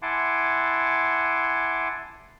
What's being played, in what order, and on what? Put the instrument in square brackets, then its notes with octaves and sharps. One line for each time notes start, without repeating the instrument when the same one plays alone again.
[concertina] E4 F#5 G#5 A5 C6 D6